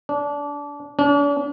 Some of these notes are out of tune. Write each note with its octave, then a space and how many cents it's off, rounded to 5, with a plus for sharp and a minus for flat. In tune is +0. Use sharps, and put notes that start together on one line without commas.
D4 -25
D4 -45